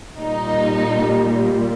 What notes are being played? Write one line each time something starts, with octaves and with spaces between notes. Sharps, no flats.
A#2 G3 D#4